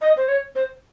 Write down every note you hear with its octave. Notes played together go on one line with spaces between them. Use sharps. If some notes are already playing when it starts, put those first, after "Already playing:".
D#5
C5
C#5
C5